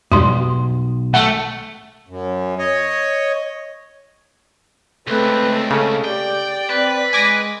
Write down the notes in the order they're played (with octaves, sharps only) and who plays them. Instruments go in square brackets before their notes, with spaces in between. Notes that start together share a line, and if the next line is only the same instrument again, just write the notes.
[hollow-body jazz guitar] B1 [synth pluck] F2 G#2 G3 [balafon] F#4 C6
[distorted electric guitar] A3 [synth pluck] F#5
[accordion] F#2
C#5 D#5
[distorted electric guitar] C#2 [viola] A3 C4 [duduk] B4
[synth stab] C#3 [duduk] A4
[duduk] G4 [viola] D5 [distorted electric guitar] G5
[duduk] C4 [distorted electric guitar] B4
[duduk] G#3 [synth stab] G#5 D6 A#6